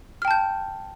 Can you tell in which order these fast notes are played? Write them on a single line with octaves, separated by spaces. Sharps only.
F6 G5 A5 G6